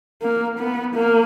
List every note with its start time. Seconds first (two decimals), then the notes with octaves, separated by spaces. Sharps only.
0.22 A#3
0.59 B3
0.95 A#3